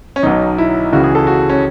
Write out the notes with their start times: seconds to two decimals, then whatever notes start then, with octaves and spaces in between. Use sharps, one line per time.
0.16 C#4
0.23 B1 B2 F#3 D#4
0.58 E4
0.92 C#2 C#3 E3 F#4
1.04 G#4
1.15 A4
1.27 F#4
1.49 C#4